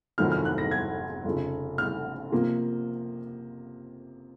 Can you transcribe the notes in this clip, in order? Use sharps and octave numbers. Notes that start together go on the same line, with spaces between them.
F1 F2 D#3 F#3 C4 F6
F6
F#6
A#6
G#6
F1 F2 C#3
F6
C3 F3 A#3